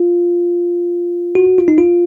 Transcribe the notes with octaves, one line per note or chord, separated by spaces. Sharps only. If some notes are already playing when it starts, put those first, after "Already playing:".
Already playing: F4
F#4
F4
D#4
F4